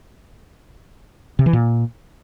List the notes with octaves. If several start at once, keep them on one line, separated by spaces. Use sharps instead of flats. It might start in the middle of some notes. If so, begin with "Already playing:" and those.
C3
E3
A#2